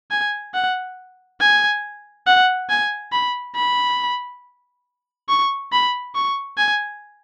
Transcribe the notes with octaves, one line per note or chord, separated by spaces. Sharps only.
G#5
F#5
G#5
F#5
G#5
B5
B5
C#6
B5
C#6
G#5